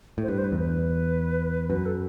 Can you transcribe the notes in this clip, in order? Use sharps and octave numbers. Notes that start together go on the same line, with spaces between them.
A2
C5
G2 B4
C5
B4
E2
B4
F#2 B4
A4